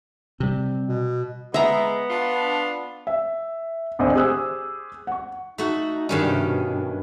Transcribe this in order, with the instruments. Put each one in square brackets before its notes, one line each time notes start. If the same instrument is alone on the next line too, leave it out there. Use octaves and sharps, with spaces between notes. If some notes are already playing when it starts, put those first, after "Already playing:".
[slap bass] C3 G3 [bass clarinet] C4
[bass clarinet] B2
[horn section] G#3 [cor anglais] B3 [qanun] E5 A#5
[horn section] D4 F4
[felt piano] E5
G#1 D2 C5 D#5
G4 G#4 C5 D#6 E6 F#6
F#5 C#6
[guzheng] A3 F#4 [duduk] D#4
[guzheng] G2 D#3 C#4 [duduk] G3
[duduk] C3
B2